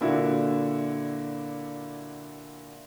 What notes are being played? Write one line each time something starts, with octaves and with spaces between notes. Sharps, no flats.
A#2 D3 E4 F#4